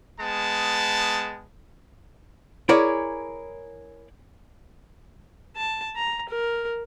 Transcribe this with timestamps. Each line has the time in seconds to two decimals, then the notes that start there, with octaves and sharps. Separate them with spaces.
0.19 G#3 B3 A5
2.69 E4 G#4 A#4 C#5 D5
5.56 A5
5.96 A#5
6.29 A#4